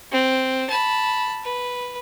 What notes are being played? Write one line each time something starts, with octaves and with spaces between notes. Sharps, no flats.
C4
A5 B5
B4